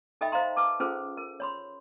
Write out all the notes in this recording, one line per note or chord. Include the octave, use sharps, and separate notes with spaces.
D#4 A4 D#5 E5 G5 B5
C5 D#5 F5 A#5 C6
B4 A5 D6
C#4 F4 G#4 A4 B4 C5
A#4
C#5 B5 C6